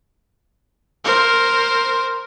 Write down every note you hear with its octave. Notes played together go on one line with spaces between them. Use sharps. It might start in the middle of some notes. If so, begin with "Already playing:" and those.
A#4 C5